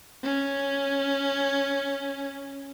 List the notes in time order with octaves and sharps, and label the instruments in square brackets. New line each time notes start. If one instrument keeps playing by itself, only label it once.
[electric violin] C#4